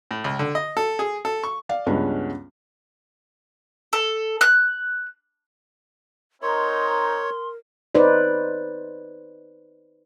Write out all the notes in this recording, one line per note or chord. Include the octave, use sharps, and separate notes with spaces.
A2
C#2
D3
D#5
A4
G#4
A4
C#6
D5 F5
C#2 G2 G#3 B3 C#4
A4
F#6
C4 D#4 A#4 C#5 C6
D#4 B4 C5 D5